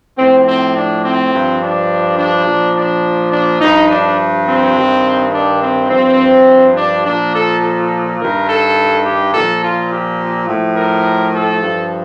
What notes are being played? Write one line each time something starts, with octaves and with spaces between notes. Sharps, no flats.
A2 F3 C4
C4
D4
C4
G2 F3
D4
D4
A#2 F3
D4
D4
G2 F3 D#4
D4
C4
G2 D#3
D4
C4
G2 F3 C4
D4
A#2 F3 D4
A4
A4
G2 D#3 A#4
A4
G4
A#2 F3 A4
F4
G4
A2 F3
A#4
A4
G2 F3